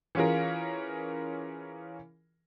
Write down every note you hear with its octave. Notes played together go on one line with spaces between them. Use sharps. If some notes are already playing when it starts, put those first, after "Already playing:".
E3 C#4 F4 G#4 A#4